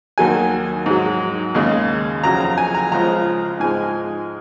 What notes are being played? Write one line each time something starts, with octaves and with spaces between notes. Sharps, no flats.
D#2 D#3 F#3 G#5
G#2 F#3
D#2 C#3 G#3
F2 C#3 F#3 A#5
A#5
G#5
A#5
C#2 C#3 F3 G#3 A#5
G#2 F3 G#3 G#5